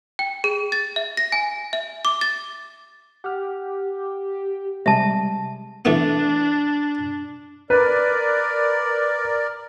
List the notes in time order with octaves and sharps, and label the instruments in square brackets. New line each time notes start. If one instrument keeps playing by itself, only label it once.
[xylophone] G5
G#4
A6
E5
A#6
G#5
E5
D6
A6
[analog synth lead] G4 [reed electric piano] F#5 F6
[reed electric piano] C3 G3 G#3 [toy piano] E5 A5
[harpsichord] E3 A3 B3 [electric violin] D4
[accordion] A#4 D5 [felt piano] B4